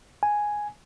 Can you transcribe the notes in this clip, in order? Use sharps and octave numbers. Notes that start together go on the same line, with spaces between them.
G#5